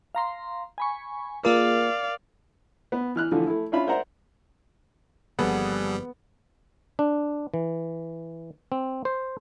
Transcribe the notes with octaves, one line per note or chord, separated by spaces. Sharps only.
F5 A#5 C6
G#5 B5 C#6
A#3 F4 G#4 A#4 D5 F5
B3
E3 F6 F#6
D3 E3 F3 A3
A3 E4
C#4 D4 F4 E5 F5 B5
A#4 C5 D5 E5 F#5 A#5
G1 F3 G3 A#3 B3 G#4 A4 F#5
D4
E3
C4
C5